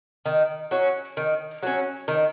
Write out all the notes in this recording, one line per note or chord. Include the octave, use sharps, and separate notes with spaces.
D#3
F#3 C#4
D#3
F#3 C#4
D#3